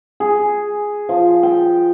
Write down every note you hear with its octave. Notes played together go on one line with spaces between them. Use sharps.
G#4
F3
G5